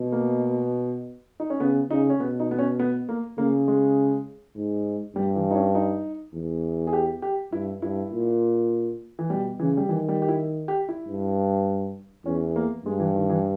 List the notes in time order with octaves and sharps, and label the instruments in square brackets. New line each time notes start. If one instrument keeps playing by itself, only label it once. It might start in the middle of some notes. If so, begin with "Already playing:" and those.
Already playing: [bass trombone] B2
[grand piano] A#3
D#4
C#4
[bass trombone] C#3 [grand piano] B3
[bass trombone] C#3 [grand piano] D#4
[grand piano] C#4
[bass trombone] B2 [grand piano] B3
[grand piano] D#4
B3
C#4
B3
A#3
[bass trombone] C#3 [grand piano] A#3
[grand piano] G#3
[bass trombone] G#2
[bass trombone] G2 [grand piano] G3
[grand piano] E3
D#4
C#4
D#4
[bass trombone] E2
[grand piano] G#4
G4
G4
[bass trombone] G2 [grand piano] E4
[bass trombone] G2 [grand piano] E4
[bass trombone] A#2
[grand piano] E3
[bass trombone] B2 [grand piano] G3
[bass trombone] C#3 [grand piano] E3
[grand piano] G3
[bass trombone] D#3 [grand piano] E3
[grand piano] G3
G4
E4
G4
E4
[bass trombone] G2
[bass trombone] E2 [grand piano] C#4
[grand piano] A#3
[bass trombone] G2 [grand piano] G#3
[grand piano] E3
D#3
E3